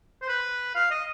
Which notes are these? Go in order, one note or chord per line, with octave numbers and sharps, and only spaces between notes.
C5
B4
F5
D#5